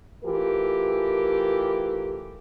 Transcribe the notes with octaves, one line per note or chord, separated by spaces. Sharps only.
E3 A3 F4 G4 A#4